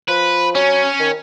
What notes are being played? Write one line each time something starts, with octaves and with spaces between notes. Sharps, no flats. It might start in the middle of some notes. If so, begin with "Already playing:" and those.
F3 B4
F#3 C#4
D#3